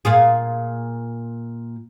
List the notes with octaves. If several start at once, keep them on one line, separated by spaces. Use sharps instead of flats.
A#2 F4 G#4